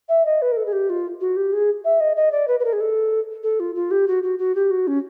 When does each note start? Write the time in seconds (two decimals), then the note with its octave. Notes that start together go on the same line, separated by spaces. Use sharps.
0.09 E5
0.25 D#5
0.42 B4
0.52 A#4
0.57 A4
0.66 G#4
0.73 G4
0.90 F4
1.21 F#4
1.36 G4
1.53 G#4
1.85 E5
2.00 D#5
2.16 D#5
2.32 D5
2.48 B4
2.60 B4
2.65 A#4
2.73 G#4
2.80 A4
3.43 A4
3.60 F4
3.75 F4
3.91 G4
4.08 F#4
4.23 F#4
4.39 F#4
4.55 G4
4.71 F#4
4.87 C#4